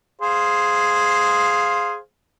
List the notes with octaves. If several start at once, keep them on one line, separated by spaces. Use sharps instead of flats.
G#4 C5 F5